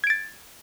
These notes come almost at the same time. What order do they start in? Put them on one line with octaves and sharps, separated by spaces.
G#6 D7 A6